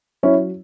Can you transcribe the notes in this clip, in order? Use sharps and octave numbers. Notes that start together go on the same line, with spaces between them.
F#3 C#4 E4